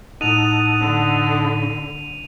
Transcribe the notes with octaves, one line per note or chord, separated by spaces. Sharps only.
A2 D#4 A4 D#5 F#5 D#7 F7
D3